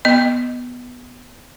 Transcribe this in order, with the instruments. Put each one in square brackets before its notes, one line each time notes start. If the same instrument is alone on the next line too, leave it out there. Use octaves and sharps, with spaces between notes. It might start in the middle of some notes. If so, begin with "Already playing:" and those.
[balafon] B3 D#5